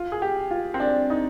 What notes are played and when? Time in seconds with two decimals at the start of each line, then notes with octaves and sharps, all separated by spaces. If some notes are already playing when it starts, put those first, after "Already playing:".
Already playing: F4
0.12 G#4
0.22 G4
0.51 F4
0.74 C4
0.80 D4
1.10 D#4